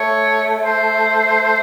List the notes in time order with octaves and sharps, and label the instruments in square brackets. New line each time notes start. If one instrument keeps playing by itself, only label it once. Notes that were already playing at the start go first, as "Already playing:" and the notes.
Already playing: [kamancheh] A3 [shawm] C#5
[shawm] C5